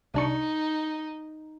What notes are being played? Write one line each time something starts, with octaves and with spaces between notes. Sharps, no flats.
C2 D4 D#4 C#6